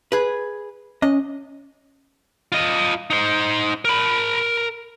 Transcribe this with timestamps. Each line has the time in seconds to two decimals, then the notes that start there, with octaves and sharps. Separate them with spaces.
0.12 G#4 B4
1.02 C#4 D#5
2.52 F4 D#5
3.10 D#4 C5
3.85 A#4 B5